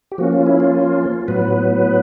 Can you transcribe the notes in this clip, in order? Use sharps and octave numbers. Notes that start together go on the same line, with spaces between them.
G4
F3 A#3 C#4 F#4
F4
E4
F4
A2 F#3 B3 B4